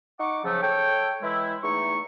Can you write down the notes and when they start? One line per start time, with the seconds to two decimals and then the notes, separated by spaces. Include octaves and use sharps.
0.19 D#4 F#5 C#6 D6
0.44 C#3 F3 F#3 A3
0.62 A4 C#5 G5
1.22 E3 G#3 E4
1.63 E2 A3 D#4 C#6